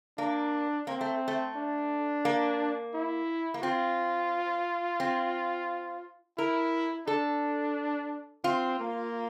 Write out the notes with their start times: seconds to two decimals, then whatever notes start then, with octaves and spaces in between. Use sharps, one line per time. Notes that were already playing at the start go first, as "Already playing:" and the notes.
0.18 A#3 D4
0.87 A#3 C4
1.01 A3
1.28 A3
1.56 D4
2.25 A#3
2.94 E4
3.54 A#3
3.62 C4 F4
5.00 C4
6.38 E4 A#4
7.07 D4 A4
8.44 C4 F4
8.79 A#3